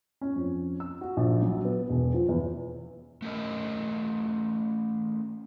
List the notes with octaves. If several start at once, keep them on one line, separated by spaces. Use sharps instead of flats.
C#4
F2
E6
F#4
A#1
F#3
B3
E1
F3
E2
A3 C#4 A#4 D#5